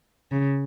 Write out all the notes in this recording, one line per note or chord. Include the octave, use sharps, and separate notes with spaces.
C#3